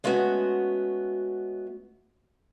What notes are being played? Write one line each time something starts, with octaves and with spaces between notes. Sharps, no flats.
G#3 A3 B3 C#4 F#4